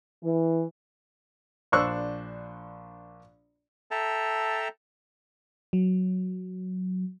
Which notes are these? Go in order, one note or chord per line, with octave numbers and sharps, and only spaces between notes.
E3
A#1 D4 C5 C#6 E6 F#6
A4 E5 G5 A5 A#5
F#3